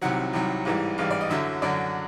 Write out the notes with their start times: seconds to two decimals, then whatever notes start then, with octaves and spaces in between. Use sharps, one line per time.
0.01 C2 C3 D#3 F#3 F#5
0.33 C2 C3 D#3 F#3
0.65 A1 G#2 E3 G3
0.98 A1 G#2 E3 G3 F5
1.10 D5
1.21 D#5
1.30 F#2 D3 F#3 E5
1.62 F#2 D3 F#3 D5